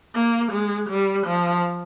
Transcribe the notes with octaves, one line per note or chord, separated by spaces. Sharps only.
A#3
G#3
G3
F3